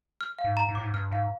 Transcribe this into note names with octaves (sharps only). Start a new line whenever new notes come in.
F6
F5
G#2
A#5
G#2
A2 D6
G#2
G2 F6
G#2 F5